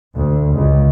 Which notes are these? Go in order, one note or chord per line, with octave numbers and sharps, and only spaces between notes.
D2
C#2